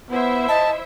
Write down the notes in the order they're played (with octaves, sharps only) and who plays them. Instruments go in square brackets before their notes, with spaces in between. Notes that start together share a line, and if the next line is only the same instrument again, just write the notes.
[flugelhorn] B3 [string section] E4 C5 E5
[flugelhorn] D#5 [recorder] A5